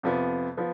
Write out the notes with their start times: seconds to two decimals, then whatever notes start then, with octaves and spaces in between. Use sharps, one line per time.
0.03 F2 C3 F3 B3
0.57 F3 B3